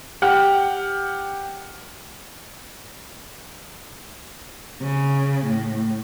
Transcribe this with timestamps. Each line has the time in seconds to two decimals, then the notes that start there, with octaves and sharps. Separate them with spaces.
0.22 G4 F#5 G5 F6
4.81 C#3
5.45 A2